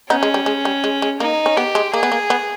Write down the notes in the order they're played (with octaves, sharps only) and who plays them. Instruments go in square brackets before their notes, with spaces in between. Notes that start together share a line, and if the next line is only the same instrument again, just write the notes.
[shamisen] B3 D#4 [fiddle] C#4
[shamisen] G#3
G3
G#3
G3
G#3
G#3
[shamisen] A#3 [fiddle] D#4
[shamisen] C#4
[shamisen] B3 [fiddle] G4
[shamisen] G#3
[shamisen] A#3 [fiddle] G#4
[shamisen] B3
A#3
B3